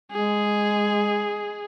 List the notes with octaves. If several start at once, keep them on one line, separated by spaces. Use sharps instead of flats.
G#3 G#4